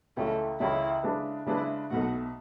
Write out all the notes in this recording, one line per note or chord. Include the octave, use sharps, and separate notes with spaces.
C#2 C#3 E3 G#3 A3 C#4
C#2 C#3 E3 G#3 C#4 E4
C#3 G#3 D4 G#4 B4
C#3 G#3 D4 E4 G#4 B4
B1 B2 A3 F#4